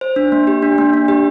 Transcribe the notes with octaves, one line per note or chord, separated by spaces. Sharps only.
C5
D4
A#3
G4
D4
A#3
D4
G4